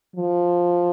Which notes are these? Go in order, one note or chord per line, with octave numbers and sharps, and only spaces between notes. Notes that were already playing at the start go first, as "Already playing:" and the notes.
F3